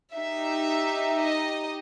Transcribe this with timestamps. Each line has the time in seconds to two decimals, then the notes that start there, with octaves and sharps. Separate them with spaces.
0.14 D#4 G4 E5
1.18 D#5